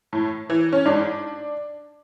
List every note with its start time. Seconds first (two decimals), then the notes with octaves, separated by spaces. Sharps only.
0.13 A2
0.50 E3
0.72 C#4
0.85 G#2 D4